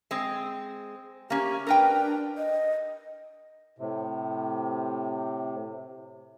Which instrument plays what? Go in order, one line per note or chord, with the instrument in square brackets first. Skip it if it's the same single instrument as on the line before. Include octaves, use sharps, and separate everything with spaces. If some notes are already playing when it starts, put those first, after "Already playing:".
[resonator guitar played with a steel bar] G#3 C4
[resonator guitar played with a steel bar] A#3 C#4 [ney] G4
[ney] D4 [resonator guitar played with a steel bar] A#4 B4 G5
[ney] D#5
[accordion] A2 C3